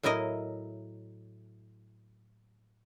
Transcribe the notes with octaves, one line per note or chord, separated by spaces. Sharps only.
A2 F#3 E4 A#4 D#5